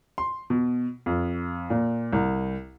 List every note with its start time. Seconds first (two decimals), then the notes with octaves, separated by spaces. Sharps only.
0.18 C6
0.50 B2
1.06 F2
1.70 A#2
2.13 C2